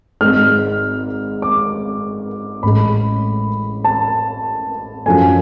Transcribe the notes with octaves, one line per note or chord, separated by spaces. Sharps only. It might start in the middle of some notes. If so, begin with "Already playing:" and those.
G#1 G#2 G#3 F6
D6
A1 A2 G#3 B5
A5
F#2 F3 A3 G#5